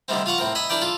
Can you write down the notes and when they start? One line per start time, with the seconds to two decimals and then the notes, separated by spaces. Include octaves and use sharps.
0.08 D3 D#3 G3 A3 C4
0.26 F4 F5 F#5 C#6
0.38 A2 C4 A#4
0.55 D#5 E5 G#5 B5
0.69 D4 E4 A#4 D5 G5
0.82 F4 A4